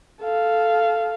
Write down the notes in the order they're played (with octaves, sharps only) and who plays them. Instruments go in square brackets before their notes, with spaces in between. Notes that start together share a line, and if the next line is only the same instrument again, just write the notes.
[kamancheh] A4 F5